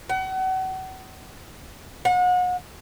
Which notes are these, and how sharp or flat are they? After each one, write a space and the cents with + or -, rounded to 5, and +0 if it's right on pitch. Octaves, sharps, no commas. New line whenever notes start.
F#5 +35
F#5 -35